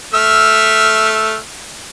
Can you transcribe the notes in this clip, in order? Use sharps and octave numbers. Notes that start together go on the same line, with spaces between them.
A3 E5 F6